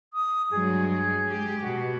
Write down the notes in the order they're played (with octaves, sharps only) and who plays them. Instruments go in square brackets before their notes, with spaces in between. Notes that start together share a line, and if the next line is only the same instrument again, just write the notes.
[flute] D#6
[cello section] G2 F#3 G#3 [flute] G#4
[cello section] G#3 G4
[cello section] B2 [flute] F#4